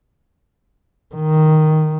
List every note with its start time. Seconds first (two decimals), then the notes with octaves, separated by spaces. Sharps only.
1.15 D#3